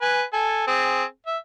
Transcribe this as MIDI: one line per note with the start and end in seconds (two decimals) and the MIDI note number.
0.02 0.23 71
0.02 0.23 80
0.33 0.64 69
0.33 0.64 80
0.67 1.04 60
0.67 1.04 68
1.27 1.37 76